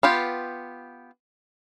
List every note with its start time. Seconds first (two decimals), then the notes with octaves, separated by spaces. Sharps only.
0.03 B3 F4 G4